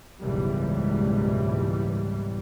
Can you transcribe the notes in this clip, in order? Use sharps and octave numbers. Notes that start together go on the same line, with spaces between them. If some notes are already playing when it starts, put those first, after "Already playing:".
F#1 C#2 G#2 B2 E3 G3